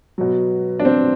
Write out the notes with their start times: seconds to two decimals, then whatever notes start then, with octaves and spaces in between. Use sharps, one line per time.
0.18 B2 F#3
0.79 D4
0.85 C4